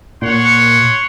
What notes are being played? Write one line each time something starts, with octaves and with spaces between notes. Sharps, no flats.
A#2 C#5 F#5 C6